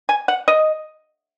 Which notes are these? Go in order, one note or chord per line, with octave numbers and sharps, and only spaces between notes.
G#5
F#5
D#5